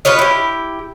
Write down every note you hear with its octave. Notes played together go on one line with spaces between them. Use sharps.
F4 B4 C#5 D#5
E4 G4